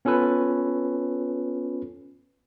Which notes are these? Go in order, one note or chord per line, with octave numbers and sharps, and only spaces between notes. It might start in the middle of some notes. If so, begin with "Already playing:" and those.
B3 C#4 F4 A4 B4